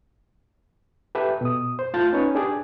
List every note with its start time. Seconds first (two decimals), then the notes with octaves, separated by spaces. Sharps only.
1.15 G4 A4 B4 E5 G5
1.41 B2 D#6
1.79 C5
1.94 A3 F4 A5 G6 A6
2.13 C#4 D#4 B4 C#5
2.35 D4 G4 G#4 D5